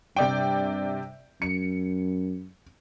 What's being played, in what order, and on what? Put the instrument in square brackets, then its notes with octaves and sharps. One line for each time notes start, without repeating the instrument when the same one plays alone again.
[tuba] G2 [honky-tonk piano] C3 D5 G5
[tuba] F#2 [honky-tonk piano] C#7